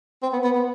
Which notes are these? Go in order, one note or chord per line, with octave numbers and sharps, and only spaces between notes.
C4
B3
B3
B3